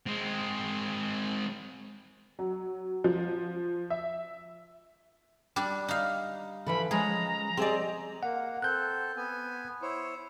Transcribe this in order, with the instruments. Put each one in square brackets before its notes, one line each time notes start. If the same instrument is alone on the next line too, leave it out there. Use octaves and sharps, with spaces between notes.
[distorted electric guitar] G#3 C4
[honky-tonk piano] F#3
F3
E5
[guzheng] G3 D4 G4
D#4 F5
[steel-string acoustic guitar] D3 E3 F3 [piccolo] B5
[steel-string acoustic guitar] F3 G#3 C#4 [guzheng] G#4 [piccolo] A#5
[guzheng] C4 D5 [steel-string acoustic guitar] G4 G#4 D#5
[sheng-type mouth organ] A#3 [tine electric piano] F#5
[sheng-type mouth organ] C4 A4 [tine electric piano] F#6 G6
[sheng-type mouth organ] B3 G#5
E4 C5 C#5